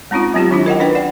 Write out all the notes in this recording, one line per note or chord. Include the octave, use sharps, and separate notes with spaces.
G#3 C4 C#4 D#4 F4
F#3 B3 C4 F4 G4
D#3 D4 E4
A#4 D#5 F#5 G5
C#4 D4 B4 G5
D5 F#5